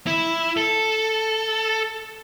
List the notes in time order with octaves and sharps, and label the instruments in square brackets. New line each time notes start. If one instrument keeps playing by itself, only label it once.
[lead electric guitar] E4
A4